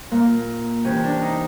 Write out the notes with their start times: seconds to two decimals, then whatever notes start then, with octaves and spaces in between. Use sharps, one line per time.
0.11 A#2 A#3
0.85 C3 E3 C#4
1.03 D4
1.21 D#4